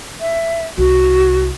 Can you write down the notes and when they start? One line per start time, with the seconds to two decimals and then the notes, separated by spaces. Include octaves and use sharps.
0.20 E5
0.78 C2 F#4